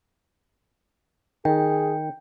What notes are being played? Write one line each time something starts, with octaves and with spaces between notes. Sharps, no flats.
D#3 G#4 G5